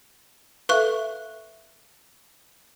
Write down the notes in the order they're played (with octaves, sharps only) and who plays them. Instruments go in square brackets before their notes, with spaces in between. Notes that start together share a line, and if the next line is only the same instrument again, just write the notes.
[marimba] A4 E5 F5 [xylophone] B4 C#6 F#6